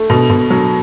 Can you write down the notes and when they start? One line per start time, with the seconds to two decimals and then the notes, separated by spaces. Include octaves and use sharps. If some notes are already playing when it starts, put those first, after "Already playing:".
Already playing: A3
0.10 B2
0.30 B2
0.50 F#3